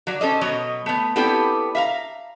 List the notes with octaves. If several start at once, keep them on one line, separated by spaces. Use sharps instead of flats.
F#3 D5
C#4 A4 C5 D#5
B2 F#3 C#5 D#5
A3 B3
B3 C4 D4 E4 G4 A4
E5 F5 A#5